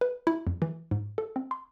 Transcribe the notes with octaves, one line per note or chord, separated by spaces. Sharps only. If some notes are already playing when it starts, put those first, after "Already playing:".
B4
E4
F2
E3
G#2
A4
C4
C6